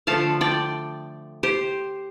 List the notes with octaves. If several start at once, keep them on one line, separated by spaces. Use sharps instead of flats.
D3 F3 A3 F5 A5
D5 G5
G4 C5